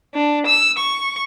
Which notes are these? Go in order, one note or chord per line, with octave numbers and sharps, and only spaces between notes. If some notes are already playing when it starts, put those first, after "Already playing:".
D4
E6
C#6